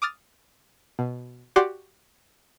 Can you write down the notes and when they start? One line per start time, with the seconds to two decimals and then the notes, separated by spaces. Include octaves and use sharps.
0.02 D6 D#6 F6 A6
0.99 B2
1.56 F#4 G4 D5 F#5 C6 D6